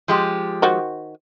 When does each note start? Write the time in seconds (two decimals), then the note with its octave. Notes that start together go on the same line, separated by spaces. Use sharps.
0.08 F3 G#3 G4
0.62 D#3 F#4 C5